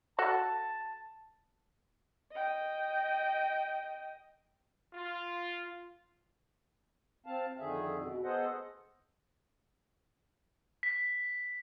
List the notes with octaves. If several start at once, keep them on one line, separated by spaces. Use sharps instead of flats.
F#4 A4 A5
D#5 G5
F4
C4 F5 A5
F2 D3 D#3 G#4 E5
B2
B3 G#4 A4 C5 D#5 F#5
B6